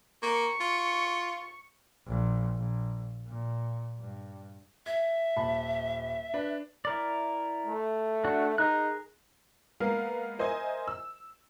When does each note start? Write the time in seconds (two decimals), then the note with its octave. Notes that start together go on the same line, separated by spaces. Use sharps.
0.22 A#3 C#6
0.60 F4
2.07 A#1
2.56 A#1
3.27 A#2
3.99 G2
4.86 E5 G#6
5.37 D#1 A5 B5
6.34 D4 B4
6.85 E4 A#4 D5
7.66 A3
8.24 D4 F#4
8.58 D#4 G#4 A#4 F#6
9.80 G#3 A#3 B3 A#4 F5
10.39 A#4 C5 D#5 E5 G#5
10.88 E6